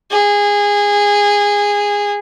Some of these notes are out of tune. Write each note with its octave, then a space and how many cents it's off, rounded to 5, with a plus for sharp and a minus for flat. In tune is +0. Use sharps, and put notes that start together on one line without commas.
G#4 -20